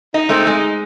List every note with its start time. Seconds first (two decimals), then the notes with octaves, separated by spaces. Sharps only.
0.14 D#4 D#5
0.29 G#3 A3 C4
0.47 G#3